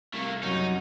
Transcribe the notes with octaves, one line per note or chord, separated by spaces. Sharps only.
C2 A3 A#3
F#2 F#3 C#4 D#4